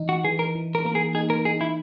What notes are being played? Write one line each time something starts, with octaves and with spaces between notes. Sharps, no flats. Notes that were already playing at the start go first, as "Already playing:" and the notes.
Already playing: E3 D#4
F#4
E3 G#4
A#4
E3
A#4
A#3 A#4
G#4
D#4 G#4
A#4
D#4 G#4
E4